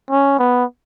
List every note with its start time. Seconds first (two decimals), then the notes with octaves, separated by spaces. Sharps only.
0.10 C#4
0.39 B3